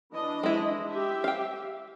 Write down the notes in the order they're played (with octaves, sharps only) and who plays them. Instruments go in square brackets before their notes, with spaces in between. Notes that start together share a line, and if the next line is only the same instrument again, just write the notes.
[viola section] E3 D4 D#5
[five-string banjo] G#3 E4
[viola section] G4 E5
[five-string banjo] F5 G5